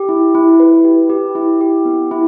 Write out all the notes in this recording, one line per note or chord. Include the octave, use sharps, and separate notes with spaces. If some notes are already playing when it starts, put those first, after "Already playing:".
Already playing: G4
E4
E4
B4
G4
G4
E4
G4
B3
E4